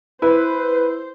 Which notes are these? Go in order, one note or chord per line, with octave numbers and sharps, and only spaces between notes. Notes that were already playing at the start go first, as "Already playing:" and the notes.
E4 B4 C5